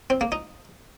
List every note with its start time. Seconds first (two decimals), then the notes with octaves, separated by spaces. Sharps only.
0.10 C4
0.21 A#3
0.32 D#4